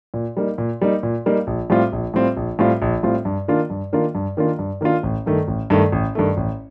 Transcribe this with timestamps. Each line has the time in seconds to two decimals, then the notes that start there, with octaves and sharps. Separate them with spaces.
0.14 A#2
0.37 G3 A#3 D#4
0.58 A#2
0.81 G3 A#3 D#4
1.03 A#2
1.26 G3 A#3 D#4
1.47 A#1
1.70 A2 G3 C4 F4
1.93 A#1
2.14 A2 G3 C4 F4
2.37 A#1
2.59 A2 G3 C4 F4
2.82 A#1
3.03 A2 G3 C4 F4
3.25 G2
3.48 D#3 A#3 D4 F4
3.70 G2
3.93 D#3 A#3 D4 F4
4.15 G2
4.37 D#3 A#3 D4 F4
4.59 G2
4.81 D#3 A#3 D4 F4
5.03 A1
5.26 G2 D#3 A3
5.48 A1
5.70 G2 D#3 A3
5.92 A1
6.15 G2 D#3 A3
6.37 A1